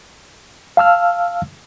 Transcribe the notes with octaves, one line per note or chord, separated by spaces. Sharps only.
F5 A5 E6 F6